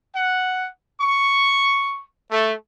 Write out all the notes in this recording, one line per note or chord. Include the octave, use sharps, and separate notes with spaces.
F#5
C#6
A3